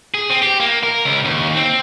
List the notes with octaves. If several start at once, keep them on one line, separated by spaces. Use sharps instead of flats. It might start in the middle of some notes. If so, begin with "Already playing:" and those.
G#4
C4
G4
A#3
A#4
C#2
D#2
C4